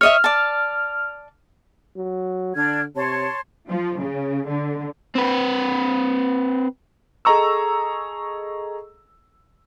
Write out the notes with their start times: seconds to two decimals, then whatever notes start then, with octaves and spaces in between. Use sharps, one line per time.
0.01 C#5 D#5 E5 F6
0.24 D5 A5
1.96 F#3
2.55 D3 D4 F6 G#6
2.95 C3 C#5 A5 C6
3.68 F3
4.01 C#3
4.48 D3
5.15 C4 B4
7.25 G#4 A4 D#5 A#5 C#6 E6